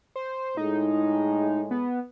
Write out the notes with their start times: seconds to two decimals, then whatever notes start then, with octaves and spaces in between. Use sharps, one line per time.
0.16 C5
0.57 A2 G#3 D#4
1.71 B3